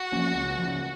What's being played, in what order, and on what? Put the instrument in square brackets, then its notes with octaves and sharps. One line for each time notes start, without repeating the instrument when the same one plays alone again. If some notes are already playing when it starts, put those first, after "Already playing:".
Already playing: [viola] F#4
[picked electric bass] F3 A#3 C#4
C#2
C#3 F3